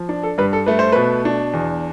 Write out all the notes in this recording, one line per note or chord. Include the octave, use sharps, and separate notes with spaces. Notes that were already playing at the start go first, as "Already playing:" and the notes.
Already playing: F3
D4
A4
G2 B4
A4
A3 B4
C5
B2 B4
D4
E2